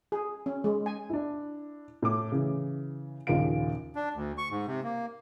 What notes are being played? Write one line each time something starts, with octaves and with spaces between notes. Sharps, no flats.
G#4
C#4
G#3
G#5
D4 E4
A2 D6
C#3 E3
A#1 D#2 A#2 C#3 F4 D7
D4
D2
C#6
G#2
C3
A#3